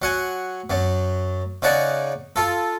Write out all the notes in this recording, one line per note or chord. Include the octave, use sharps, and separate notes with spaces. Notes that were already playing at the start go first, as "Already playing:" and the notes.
F#3 F#5 G#5
F#2 F#3
C#3 D#4 D5 F#5 G#5
F4 A4